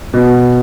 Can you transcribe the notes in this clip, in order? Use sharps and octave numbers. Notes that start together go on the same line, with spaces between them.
B2